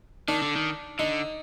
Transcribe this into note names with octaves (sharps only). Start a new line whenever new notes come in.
D#3 D4
D3
D#3
D3 D#4